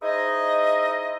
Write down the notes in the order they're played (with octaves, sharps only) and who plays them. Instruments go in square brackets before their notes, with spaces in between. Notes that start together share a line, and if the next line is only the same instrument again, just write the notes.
[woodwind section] D#4 E4 G#4 C5 D#5